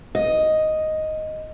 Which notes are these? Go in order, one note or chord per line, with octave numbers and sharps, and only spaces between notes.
D#5